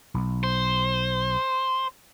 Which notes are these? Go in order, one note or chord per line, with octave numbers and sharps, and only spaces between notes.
B1
C5